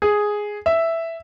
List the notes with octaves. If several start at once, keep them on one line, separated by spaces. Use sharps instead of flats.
G#4
E5